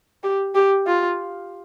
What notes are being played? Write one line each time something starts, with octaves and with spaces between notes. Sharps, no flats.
G4
G4
F4